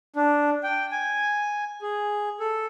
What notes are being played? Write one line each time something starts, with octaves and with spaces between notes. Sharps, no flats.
D4
G5
G#5
G#4
A4